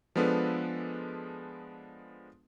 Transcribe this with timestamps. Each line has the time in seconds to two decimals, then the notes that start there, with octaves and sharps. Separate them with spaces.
0.16 F3 G#3 B3 D4 A4 B4